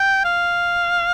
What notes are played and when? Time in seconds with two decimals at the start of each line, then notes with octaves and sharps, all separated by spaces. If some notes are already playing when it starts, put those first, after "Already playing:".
Already playing: G5
0.24 F5